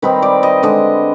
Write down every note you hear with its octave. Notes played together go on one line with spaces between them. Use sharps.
D#3 G3 C4 D#4 B4
D5
D#5
D3 G#3 D4 D#5